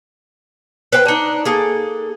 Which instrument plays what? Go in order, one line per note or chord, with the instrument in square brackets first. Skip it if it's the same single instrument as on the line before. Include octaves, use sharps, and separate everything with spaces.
[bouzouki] B4 C5 G5
D4 D#4
A#3 G#4 A4